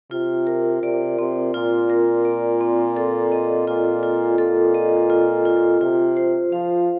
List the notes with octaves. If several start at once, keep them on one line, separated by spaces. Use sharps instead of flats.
C3 F4
A#4
C3 D5
C3 C4
A#2 F4
A#4
D5
C4
A4
D#5
A#2 F4
F4
A#2 A4
D#5
F4
F4
C3 F4
C5
F3 F5